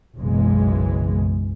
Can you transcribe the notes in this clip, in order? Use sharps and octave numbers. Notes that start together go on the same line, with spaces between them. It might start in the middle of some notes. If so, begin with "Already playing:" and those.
F#1 B1 F#2 E3 G#3